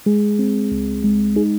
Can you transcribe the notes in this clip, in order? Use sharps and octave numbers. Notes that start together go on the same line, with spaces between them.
G#3 G#4
C4
C#2
G#3
D#4 G#4